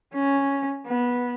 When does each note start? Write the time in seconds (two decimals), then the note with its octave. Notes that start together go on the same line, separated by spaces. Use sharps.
0.14 C#4
0.87 B3